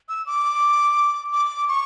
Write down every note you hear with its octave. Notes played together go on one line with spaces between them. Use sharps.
E6
D6
D6
C#6